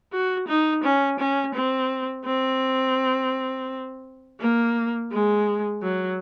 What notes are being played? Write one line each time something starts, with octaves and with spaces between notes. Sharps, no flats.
F#4
D#4
C#4
C#4
C4
C4
A#3
G#3
F#3